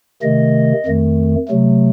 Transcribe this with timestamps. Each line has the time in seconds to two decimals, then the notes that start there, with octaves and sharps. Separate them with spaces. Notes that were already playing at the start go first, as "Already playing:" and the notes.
0.22 C3 D#3 A3 D#5
0.86 F2 D#3 A3
1.49 C3 F#3 A3